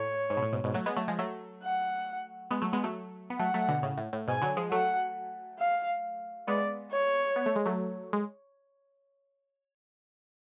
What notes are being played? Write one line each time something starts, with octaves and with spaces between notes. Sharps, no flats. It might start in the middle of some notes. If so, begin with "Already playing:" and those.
Already playing: A2 C#5
G#2
B2
A2
G#2 B2
G#2 B2
F#3 A3
G#3 B3
F#3 A3
F3 G#3
F#3 A3
F#5
G#3 B3
F#3 A3
G#3 B3
F#3 A3
B3
F#3 A3 F#5
F#3 A3
B2 D3
A2 C#3
A2
A2
G#2 B2 G#5
D3 F#3
F3 G#3
F#3 A3 F#5
F5
G#3 B3 D5
C#5
B3
A3
G#3
F#3 A3
G#3